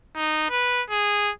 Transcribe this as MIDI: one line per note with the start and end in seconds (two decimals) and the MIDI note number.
0.16 0.47 63
0.50 0.82 71
0.90 1.32 68